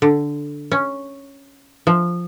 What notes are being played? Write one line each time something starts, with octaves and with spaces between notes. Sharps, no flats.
D3
C#4
F3